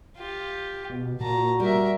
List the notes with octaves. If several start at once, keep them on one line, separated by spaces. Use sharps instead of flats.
F4 G4
B2
A#2 F#4 A5 A#5
G3 A#4 E5